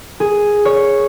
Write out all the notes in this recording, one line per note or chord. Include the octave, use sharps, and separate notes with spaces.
G#4
C#5